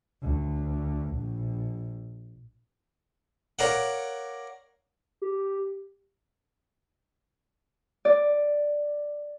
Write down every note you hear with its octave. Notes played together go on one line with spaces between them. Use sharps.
D2
A#1
A#4 C#5 D5 F5 F#5
G4
D5